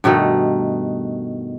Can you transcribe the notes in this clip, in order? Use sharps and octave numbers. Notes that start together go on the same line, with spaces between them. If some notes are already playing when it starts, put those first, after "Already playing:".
G2 B2 D#3 A3